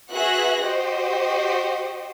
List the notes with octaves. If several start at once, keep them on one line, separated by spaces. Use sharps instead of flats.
F#4 G#4 B4 E5 F#6 A#6
F#4 G4 C5 D#5